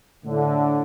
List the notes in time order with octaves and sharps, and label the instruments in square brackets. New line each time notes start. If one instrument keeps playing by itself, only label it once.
[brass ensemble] A2 D3